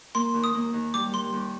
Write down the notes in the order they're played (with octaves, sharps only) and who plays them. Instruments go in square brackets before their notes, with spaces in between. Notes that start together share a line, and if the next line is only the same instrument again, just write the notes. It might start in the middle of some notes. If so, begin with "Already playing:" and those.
[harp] A#3 [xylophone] C6
[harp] D#2
[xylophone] D#6
[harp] A#3
D#2
[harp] G3 [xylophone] D6
[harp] G3 [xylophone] C6
[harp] D#2